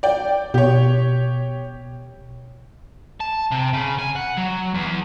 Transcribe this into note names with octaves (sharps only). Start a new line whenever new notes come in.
D5 G5
B2 G4 C#5
A5
C3
C#3
G#5
F#5
F#3
E2